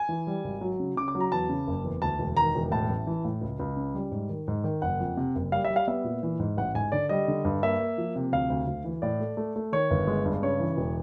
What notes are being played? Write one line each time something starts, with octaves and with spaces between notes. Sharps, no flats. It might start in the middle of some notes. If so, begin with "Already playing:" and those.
Already playing: G#5
E3
G3
G#1
F#3
C#3
C#3 D6
D6
F#3
A#5
E2 A5
C#3
F#1
E2
D2 A5
E1
D#3 A#5
E1
A2 A5
A1
E3
A2
C#2
C#2
C#3
G3
G#2
D#3
G#2
D#3
F#1 F#5
F2
C3
F#1
G3 F5
E5
G3
F5
B3 E5
A#2
E3
G#2
A1 F#5
G#2 G#5
D3 D5
G3 D#5
D3
G2
A#3 E5
A#3
F3
C3
D2 F5
D2
D2
E3
A2 D5
A3
A3
A3
D#3 C#5
G1
G#3
G2
C#3 C#5
E3
E1